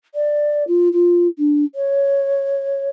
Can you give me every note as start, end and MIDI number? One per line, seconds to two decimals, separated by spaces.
0.14 0.64 74
0.67 0.89 65
0.93 1.27 65
1.38 1.64 62
1.75 2.89 73